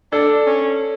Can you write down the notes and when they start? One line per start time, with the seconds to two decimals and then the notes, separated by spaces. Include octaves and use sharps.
0.12 D4 A4
0.47 C#4